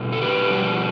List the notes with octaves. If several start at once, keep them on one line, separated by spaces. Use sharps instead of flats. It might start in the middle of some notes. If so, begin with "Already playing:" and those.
Already playing: B2 G3
A4
G4 B4
B2 G3